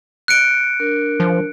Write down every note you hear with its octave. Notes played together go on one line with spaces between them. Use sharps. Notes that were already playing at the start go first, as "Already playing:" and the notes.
F#6 C#7 D7
D4 A#4
F3